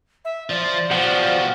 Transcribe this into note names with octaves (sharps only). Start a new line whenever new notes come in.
E5
F3 F4 D5
B2 F3 G3 F#5